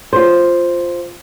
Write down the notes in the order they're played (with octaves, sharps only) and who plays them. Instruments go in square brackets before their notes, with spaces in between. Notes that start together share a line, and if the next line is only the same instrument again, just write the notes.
[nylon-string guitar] F4 C5